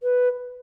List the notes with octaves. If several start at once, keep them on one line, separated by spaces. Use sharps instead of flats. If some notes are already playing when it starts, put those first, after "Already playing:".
B4